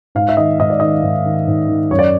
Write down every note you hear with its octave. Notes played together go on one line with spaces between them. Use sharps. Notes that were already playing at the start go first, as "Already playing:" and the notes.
G#2 F5
E5
D#3 D#5
G#2 D#5
D5
D#3 D#5
G#2
D#3
G#2
D#3
F#2 C#5
D5